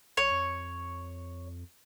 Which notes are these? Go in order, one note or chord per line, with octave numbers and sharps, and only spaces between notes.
A#1 C#5
F2